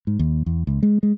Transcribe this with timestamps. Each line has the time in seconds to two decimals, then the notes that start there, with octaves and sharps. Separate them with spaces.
0.07 G#2
0.19 D#2
0.46 E2
0.67 C#2
0.83 G#3
1.03 G#3